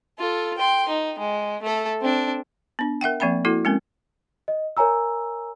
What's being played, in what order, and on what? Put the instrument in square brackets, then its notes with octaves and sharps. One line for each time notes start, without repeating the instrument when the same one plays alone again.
[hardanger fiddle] F4 A4
G5 C6
D#4
G#3
A3 A4
C4 D4
[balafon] B3 D4
A#4 E5 F#5 G5
F3 A#3 C4 E5 B5
A#3 E4 F#4 A4
G#3 C4 C#4 A#4
[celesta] D#5
A#4 C#5 G#5 A#5 E6